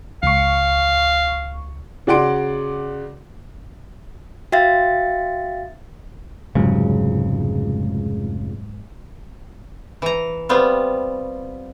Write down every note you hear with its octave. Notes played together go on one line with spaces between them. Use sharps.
C#2 F5 C#6
C#3 F#4 D5 F#5 C6 D7
F#4 E5 F5 G5 A6
F1 C#2 G#2 C#3 F#3
E3 A#5
G3 B3 C4 F4